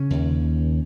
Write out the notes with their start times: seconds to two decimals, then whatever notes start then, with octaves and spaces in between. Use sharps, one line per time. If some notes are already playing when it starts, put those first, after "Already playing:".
Already playing: C#3 C#4
0.10 D#2